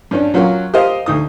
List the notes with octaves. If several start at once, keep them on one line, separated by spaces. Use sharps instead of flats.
G2 C#4 D4
F#3 C#4 F4 F#4 A#4
G4 A#4 C5 D#5 F5
D2 D#4 D#6